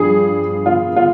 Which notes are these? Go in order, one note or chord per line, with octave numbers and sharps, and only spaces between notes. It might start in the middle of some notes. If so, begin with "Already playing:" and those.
Already playing: G2 F3 G#4
F4
F4